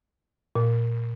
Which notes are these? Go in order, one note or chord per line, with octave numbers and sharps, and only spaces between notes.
A#2